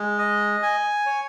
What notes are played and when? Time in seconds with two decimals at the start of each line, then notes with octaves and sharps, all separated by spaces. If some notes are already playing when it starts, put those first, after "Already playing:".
Already playing: G#3
0.18 D#5
0.62 G#5
1.06 C#5